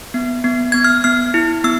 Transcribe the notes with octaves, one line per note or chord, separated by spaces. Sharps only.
B3
B3
B3 G#6
F6
B3 F6
E4
B3 E6